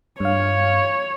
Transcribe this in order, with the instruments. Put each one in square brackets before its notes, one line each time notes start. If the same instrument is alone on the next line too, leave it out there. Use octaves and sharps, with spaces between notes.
[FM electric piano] G2 F5 [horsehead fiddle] C#5